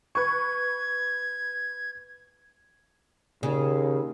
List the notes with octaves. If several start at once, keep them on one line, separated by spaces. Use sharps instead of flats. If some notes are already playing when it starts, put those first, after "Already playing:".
B4 C#6 G#6
D#2 C#3